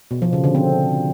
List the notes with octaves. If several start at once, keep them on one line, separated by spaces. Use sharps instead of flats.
B2
F3
C#3
D3
C4